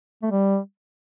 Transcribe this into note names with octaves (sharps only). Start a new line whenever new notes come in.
A3
G3